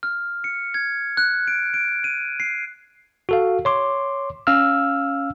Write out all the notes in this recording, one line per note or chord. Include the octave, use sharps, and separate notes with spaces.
F6
C#7
G#6
F#6
D7
D7
D#7
C7
F#4 A4 F5
C#5 C6 D6
C#4 F5 E6 F6